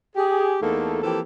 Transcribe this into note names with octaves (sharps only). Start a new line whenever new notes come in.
G4 G#4
E2 A3 A#3 D#4 A4
E3 F3 A#3 C4 G4 A4